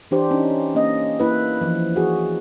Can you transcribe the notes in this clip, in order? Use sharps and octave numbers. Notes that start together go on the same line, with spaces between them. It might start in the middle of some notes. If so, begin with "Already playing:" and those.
E3 D4 G4 C5
C#4 D#4
A#3 C#4 D#5
A#3 E4 B4
E3 F3
F#4 G#4